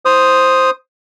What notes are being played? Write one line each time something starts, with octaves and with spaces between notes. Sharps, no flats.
C5 D#6